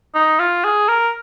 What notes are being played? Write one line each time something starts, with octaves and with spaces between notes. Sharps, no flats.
D#4
F4
G#4
A#4